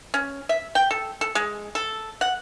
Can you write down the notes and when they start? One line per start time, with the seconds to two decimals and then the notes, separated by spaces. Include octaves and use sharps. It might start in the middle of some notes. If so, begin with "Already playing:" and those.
0.14 C#4
0.49 E5
0.75 G5
0.91 A4
1.21 A4
1.35 G#3
1.75 A4
2.21 F#5